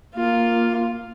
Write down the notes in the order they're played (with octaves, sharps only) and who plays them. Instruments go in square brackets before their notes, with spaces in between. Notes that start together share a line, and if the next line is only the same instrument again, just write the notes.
[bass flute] A#3 [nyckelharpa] F4